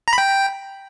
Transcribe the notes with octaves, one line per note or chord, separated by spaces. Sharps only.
A#5
B5
G5